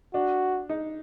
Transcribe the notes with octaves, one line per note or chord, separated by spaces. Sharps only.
D4 F#4
D#4